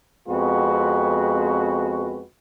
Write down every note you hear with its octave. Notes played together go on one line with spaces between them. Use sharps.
F2 G#3 B3 C4 F#4 B4